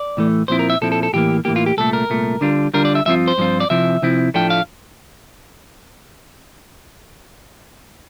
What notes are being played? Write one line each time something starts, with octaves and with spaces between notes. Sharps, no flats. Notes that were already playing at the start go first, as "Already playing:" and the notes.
Already playing: D5
A2 E3 A3
A#2 F3 C4 E4 C5
A#4
E5
A#2 F3 C4 E4 A4
A4
A4
A2 E3 A#3 G4
A2 E3 A#3 G4
F4
G4
C2 A#2 A3 A4
A#4
C2 A#2 A3
D3 G3 D4 F4
D3 G3 D4 F4 A#4
D5
E5
G2 F3 C4 F4 E5
C5
G2 F3 C4 F4
D5
C3 F3 C4 E4 E5
C3 F3 C4 E4
A2 F3 A3 D4 F4 G5
F5